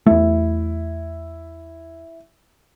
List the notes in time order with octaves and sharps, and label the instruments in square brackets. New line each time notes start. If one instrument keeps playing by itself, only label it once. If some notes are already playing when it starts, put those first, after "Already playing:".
[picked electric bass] E2 A3 [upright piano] E4